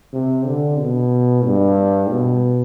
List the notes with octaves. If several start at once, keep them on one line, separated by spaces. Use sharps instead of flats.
C3
D3
B2
G2
B2